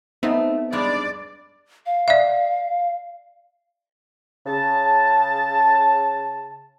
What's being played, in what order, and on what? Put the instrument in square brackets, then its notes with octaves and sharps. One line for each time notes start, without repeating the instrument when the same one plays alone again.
[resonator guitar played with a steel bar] A3 [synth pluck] B3 C4 D#4
[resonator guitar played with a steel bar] G2 G#3 D4 [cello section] D5
[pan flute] F5
[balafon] D5 E5
[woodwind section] C#3 A5